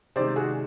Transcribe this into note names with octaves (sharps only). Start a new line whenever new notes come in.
C3 D#3 G#3 C5 D5
F#4 G#4